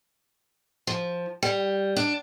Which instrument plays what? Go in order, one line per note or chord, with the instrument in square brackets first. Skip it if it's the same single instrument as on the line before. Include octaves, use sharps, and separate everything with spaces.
[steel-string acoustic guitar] F3
G3
D4